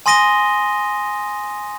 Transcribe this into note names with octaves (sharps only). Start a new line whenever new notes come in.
G#5 C6 D#6 A#6 D#7 G7